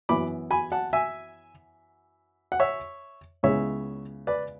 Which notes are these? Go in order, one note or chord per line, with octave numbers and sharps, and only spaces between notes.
F#2 E3 B3 E4 B5 D6
G#5 B5
F#5 A5
E5 G#5
F#5
C#5 E5
C#2 C#3 G#3 B3 E4 C#5 E5
B4 D5